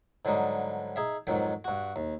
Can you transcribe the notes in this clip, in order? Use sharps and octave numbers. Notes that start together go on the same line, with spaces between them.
G#2 D3 F#3 G3 D#4
D#4 G#4 E5
F2 G#2 D#3 F#3
G2 F#4
D#2